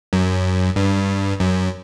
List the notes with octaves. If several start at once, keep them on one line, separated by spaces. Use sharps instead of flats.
F#2
G2
F#2